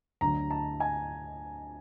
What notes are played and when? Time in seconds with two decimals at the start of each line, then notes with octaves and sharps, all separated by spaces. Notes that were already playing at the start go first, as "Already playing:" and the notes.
0.21 D2 D3 F#3 A#5
0.51 A5
0.80 G#5